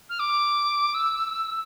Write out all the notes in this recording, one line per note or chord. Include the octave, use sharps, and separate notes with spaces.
F6
D6
E6